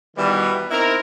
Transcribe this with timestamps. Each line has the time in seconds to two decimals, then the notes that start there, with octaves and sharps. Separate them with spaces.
0.17 B2 D#3 E3 G3
0.71 C4 D#4 E4 A#4